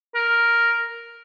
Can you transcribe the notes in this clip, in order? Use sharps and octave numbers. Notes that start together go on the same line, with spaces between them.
A#4